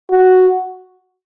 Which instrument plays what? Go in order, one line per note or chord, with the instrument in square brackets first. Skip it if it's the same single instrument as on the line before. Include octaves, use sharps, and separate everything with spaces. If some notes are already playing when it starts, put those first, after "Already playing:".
[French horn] F#4